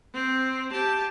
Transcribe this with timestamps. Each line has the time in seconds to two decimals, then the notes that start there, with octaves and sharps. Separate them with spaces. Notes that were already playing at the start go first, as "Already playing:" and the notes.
0.14 C4
0.71 G4 A5